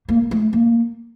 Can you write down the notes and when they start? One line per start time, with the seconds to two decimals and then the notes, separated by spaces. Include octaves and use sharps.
0.09 A#3
0.31 A3
0.53 A#3